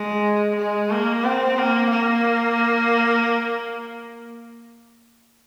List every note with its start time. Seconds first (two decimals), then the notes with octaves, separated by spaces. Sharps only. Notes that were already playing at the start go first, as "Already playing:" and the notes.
Already playing: G#3
0.56 G#3
0.90 A#3
1.24 C4
1.58 A#3
1.91 A#3